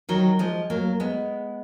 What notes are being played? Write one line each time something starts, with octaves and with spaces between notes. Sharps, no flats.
D#3 F#3
F3 G#3
F#3 A#3
G#3 B3